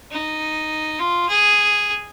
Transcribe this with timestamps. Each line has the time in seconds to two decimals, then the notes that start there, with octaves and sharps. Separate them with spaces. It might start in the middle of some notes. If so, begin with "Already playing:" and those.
0.11 D#4
0.99 F4
1.29 G#4